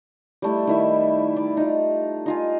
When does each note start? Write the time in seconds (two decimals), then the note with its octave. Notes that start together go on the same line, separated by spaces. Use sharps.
0.42 G3 A3 E4
0.67 D#3 E4 E5
1.36 D5
1.57 D#4 F4
2.26 D#4 F4 G#5